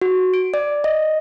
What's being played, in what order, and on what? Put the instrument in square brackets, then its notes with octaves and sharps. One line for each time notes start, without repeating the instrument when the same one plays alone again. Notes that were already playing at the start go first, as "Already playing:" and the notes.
[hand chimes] F#4
D7
D5
D#5